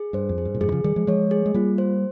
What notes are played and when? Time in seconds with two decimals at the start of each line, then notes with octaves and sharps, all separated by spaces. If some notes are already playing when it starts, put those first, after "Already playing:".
Already playing: G#4
0.13 G2 C5
0.29 F2
0.38 G#4
0.45 G2
0.54 A#2
0.61 F2 G#2 G#4
0.68 D#3
0.72 C#3 F3
0.84 D#3 G3 G#4
0.96 F3 G#3
1.07 F3 G#3 C#5
1.31 G#4
1.46 G#3
1.54 G3 A#3 F4
1.78 C5